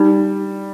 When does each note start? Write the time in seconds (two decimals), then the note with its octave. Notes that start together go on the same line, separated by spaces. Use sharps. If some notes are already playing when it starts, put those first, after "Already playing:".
Already playing: G3 D#4